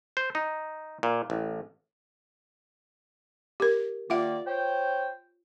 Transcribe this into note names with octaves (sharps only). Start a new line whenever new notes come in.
C5
D#4
A#2
A1
G4 A#4
D#3 A#3 F4 D5 E5 F#5
C5 C#5 G5